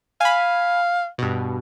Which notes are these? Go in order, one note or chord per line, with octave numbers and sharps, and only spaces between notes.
F5 G#5 B5
G2 B2